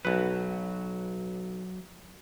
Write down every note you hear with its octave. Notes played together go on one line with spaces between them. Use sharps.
B1 F#3 B4